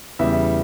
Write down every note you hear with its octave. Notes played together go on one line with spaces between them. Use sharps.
E2 C#3 G3 E5